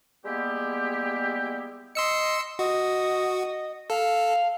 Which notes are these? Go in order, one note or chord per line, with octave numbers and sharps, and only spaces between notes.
G3 G#3 A#3 B3 E4 G4
D#5 C6 E6 C#7
F#4 D#5
A4 F5